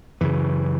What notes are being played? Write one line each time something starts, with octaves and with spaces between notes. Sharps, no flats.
F#2 C#3 E3